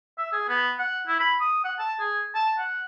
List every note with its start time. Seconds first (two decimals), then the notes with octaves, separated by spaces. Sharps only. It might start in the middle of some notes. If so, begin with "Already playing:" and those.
0.18 E5
0.32 G#4
0.49 B3
0.79 F#5
1.07 E4
1.19 B5
1.40 D#6
1.64 F#5
1.79 A5
1.99 G#4
2.35 A5
2.59 F#5